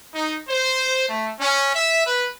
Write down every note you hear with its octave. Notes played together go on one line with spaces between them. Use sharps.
D#4
C5
A3
C#4
E5
B4